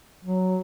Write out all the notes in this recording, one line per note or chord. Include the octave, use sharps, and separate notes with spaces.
F#3